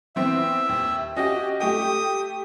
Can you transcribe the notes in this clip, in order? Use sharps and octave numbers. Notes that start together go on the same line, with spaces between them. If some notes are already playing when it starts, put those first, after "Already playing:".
E3 B3 C4 E5
D#2
C#4 F#4 G4 D#5
A3 G4 G5 D#6